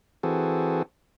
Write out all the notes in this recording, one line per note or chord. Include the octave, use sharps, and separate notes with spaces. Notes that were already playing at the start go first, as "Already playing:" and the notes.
E3 C4 F#4 G#4 A4